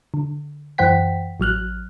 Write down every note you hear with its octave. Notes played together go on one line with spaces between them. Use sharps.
D3
F#2 E3 C5 F#5 G5 B6
A1 F#3 F6 F#6